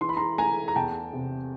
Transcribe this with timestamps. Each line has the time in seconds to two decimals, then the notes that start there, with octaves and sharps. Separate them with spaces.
0.01 E3 C6
0.09 B5
0.17 A#5 C6
0.38 A3 G#5 A#5
0.68 A#5
0.76 E2 G5 A5
1.13 C3